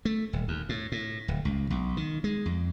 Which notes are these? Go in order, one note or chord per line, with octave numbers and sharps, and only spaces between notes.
A3
D#1
D#2
A2
A2
D1
C#2
B1
D#3
G#3
F2